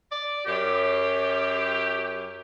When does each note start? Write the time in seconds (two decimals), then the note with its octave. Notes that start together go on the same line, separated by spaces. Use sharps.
0.12 D5
0.46 F#2 G4